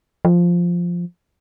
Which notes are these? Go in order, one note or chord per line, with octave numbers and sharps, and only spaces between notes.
F3